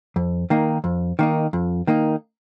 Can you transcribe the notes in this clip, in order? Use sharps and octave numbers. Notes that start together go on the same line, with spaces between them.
F2
D#3 A#3 D#4
F2
D#3 A#3 D#4
F2
D#3 A#3 D#4